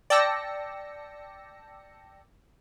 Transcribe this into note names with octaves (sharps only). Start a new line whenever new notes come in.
D5 G5 A5 E6 A#6 C#7